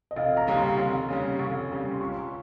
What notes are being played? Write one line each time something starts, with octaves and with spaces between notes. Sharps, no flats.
D#5
F1 F5
A#5
D#2 C#3 G3 C#4
C6
F1
D#2 C#3 G3 C#4
F1 C#6
D#2 C#3 G3 C#4
C6
C#2 C#6